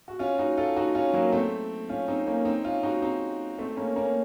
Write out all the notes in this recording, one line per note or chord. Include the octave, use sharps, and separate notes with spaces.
F#4
C#4 F4
D#4 F#4
F4 A4
D#4 F#4
C#4 F4
F#3 A#3
A3 C4
C#4 F4
C4 D#4
A#3 C#4
C4 D#4
C#4 F4
D#4 F#4
C4 D#4
A3 C4
A#3 C#4
A#3 C#4